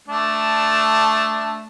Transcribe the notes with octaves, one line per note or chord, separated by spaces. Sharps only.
A3 D4